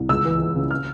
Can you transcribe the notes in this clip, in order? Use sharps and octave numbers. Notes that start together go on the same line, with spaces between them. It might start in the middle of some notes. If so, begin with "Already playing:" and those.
Already playing: C2
C#2 E6
E3
E3
C#3
F6